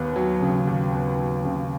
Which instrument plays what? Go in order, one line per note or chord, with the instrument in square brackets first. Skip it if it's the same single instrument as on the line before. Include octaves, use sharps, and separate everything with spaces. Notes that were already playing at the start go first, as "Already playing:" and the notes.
Already playing: [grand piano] D#2 B3
F#3
C#3
D#2
B3
F#3
C#3